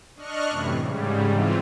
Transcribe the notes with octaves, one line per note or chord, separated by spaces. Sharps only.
D4 D#5 C#6 F6 F#6
F#2 A2 C3 E3
G#2 C#3 G3
G#2 E3 C4 F4